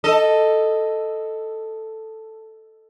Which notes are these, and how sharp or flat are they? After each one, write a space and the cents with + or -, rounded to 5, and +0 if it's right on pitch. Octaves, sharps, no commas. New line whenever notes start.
A4 +5 D#5 +0